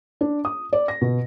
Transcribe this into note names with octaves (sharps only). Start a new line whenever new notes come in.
D4
D#6
D5
A#6
B2